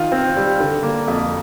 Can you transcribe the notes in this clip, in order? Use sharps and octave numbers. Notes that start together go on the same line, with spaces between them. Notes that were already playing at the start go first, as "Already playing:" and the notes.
Already playing: D#3 F4
C4
G3
D3
A#3
F2